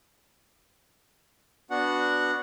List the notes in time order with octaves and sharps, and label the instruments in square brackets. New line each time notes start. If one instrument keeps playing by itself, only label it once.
[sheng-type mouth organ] B3 D4 F#4 F#5